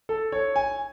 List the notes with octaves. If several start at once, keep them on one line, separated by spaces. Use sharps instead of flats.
A4
C#5
G#5